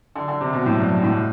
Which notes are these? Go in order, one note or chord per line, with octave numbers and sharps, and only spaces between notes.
D3
D3
C3
B2
A2
G2
G2
A2